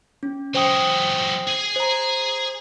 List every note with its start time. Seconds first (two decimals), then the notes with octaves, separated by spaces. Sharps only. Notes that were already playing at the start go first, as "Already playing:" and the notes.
0.23 C#4
0.55 F#3 G#3 C5 G5 D#6
1.48 G#4 G#5
1.76 C5 A#5